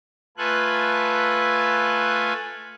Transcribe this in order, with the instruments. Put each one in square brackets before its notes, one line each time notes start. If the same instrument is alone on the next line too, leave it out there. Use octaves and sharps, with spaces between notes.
[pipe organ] A3 F4 A4 B4 G#5 F#6